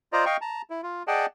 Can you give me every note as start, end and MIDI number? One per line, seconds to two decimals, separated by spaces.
0.13 0.25 65
0.13 0.25 72
0.13 0.25 74
0.13 0.25 75
0.13 0.25 82
0.26 0.37 75
0.26 0.37 77
0.26 0.37 79
0.26 0.37 85
0.41 0.62 81
0.41 0.62 82
0.70 0.81 64
0.83 1.03 65
1.07 1.26 68
1.07 1.26 74
1.07 1.26 75
1.07 1.26 78
1.07 1.26 79
1.07 1.26 81